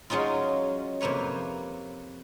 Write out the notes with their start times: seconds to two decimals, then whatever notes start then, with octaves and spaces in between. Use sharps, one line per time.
0.10 F#3 G#3 C#4 D#4 F4
1.01 F2 C3 A#3 B4 C#5